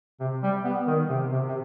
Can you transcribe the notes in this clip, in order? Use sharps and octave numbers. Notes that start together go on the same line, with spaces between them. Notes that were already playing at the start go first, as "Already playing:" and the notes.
C3
G3
B3
D#3
C3
C3
C3